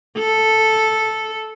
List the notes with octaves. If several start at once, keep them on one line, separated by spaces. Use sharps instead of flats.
A4